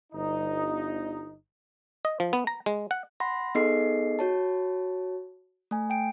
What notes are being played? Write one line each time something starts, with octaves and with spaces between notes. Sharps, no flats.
G1 D#4
D#5
F3
B3
A#5
G#3
F#5
F#5 B5 C6 A#6
B3 D#4 G#4 A4 D#5 C7
F#4 C#5 A5
A3 G#5
G5 D7